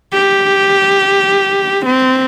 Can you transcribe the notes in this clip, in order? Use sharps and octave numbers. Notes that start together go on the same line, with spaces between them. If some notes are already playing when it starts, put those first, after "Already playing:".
G4
C4